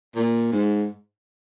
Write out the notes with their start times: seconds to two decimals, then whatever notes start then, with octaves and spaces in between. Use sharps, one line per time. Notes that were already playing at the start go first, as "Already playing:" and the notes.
0.15 A#2
0.52 G#2